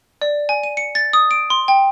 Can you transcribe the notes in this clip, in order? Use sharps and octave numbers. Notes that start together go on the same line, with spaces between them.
D5
G#5
D#7
C#7
A6
D#6
D7
C6
G5